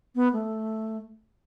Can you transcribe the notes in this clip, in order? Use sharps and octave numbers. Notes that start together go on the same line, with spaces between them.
B3
A3